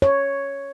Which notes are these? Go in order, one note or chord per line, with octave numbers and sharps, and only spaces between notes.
C#5